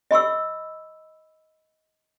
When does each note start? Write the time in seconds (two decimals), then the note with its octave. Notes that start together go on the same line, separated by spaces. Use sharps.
0.11 D#5 B5 C#6 E6